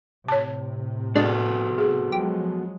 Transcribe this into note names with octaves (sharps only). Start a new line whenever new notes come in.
A2 C3 C#5 A5
G#3 B3 D4 F#4 A4
G#4
F3 F#3 G#3 G4